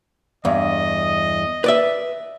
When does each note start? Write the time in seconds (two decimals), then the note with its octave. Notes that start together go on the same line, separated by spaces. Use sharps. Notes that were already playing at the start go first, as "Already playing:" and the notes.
0.45 E2 G2 D#5
1.64 B4 D5 E5